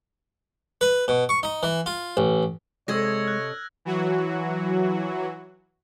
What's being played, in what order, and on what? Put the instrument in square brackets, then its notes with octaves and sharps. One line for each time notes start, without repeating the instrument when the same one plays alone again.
[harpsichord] B4
B2
C#6
D#4
E3
F4
A1
[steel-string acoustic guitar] C3 A4 D#5 [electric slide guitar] G#3 [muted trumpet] C#5 [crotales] E6 G#6 A#6
[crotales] F6 F#6
[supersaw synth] E3 F#3 F#4